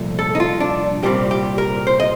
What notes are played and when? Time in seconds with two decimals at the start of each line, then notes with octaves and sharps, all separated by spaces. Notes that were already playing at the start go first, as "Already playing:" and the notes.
Already playing: C2 A#2 F3 A3
0.19 A4
0.35 D#4
0.40 F4
0.60 D4
1.03 C2 A#2 G3 C4 G4
1.31 G4
1.58 A#4
1.87 C5
2.00 D#5